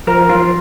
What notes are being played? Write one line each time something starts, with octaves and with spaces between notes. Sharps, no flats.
F3 A#4
F4